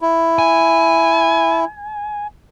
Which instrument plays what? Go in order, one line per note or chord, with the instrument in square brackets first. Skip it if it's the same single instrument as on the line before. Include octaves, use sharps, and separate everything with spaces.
[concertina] E4
[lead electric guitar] G#5